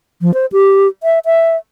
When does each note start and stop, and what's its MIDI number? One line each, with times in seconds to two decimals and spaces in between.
0.22 0.33 53
0.34 0.46 72
0.52 0.88 67
1.03 1.19 76
1.25 1.56 76